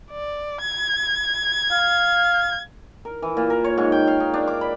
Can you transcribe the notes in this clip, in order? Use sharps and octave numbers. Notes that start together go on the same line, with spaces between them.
D5
G#6
F5
A#4
E3
A#2
A#4
C#5
G#2
G5
F5
D#4
D4
D6
B5